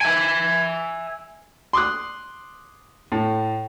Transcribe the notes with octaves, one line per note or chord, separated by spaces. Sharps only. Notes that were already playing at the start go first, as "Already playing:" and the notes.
E5 G#5
C6 D6 D#6 F#6
A2